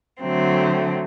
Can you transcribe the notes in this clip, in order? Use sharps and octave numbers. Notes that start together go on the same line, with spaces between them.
D3 F#3 A3 C4